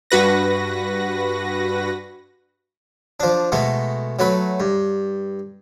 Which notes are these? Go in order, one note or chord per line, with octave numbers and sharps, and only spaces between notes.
G2 F#4 B4 A#6
F3 D4
B2 G#3 A3 B3
F#3 A3 B4
G2